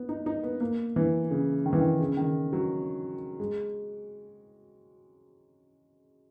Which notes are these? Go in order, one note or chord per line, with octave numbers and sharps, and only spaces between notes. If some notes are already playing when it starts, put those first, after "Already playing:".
Already playing: B3
D#4
D#4
B3
A#3
E3
C#3
D#3
E3
D#3
C#3
D#3
F#3
G#3